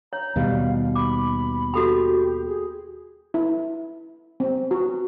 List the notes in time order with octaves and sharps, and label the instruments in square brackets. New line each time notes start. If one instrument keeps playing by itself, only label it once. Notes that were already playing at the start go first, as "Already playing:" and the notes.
[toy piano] C#5 [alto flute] A#5
[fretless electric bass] D#2 B2 G3 [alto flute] F5
[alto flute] B5 [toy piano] D6
[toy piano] F#4 A4 B5 [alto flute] G4
[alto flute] G#4
[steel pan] E4
C4
F#4